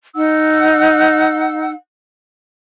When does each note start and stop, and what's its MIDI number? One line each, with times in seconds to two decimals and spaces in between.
0.15 1.71 63
0.15 1.71 78
0.15 1.71 88